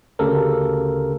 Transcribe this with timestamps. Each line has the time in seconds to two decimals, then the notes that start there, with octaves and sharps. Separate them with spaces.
0.19 D2 C#3 G4 A4 A#4